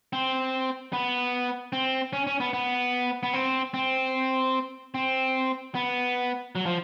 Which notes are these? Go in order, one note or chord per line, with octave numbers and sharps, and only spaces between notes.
C4
B3
C4
C#4
C#4
B3
B3
B3
C4
C4
C4
B3
F#3
F3